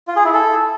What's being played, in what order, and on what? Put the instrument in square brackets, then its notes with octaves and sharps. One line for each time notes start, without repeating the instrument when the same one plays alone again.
[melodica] F4
G#4
E4
A4